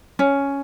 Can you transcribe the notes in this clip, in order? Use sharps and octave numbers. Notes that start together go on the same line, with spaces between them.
C#4